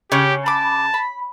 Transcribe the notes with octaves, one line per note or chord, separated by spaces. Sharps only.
C#3 G4 C#5
A5 B5 D6
B5